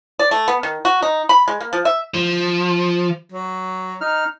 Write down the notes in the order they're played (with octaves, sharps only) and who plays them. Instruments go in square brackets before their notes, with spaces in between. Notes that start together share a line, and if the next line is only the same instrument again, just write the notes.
[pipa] D5
A3
B3
D#3
F#4
D#4
B5
G#3
A#3
F3
E5
[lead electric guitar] F3
[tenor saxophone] F#3
[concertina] D#4 F6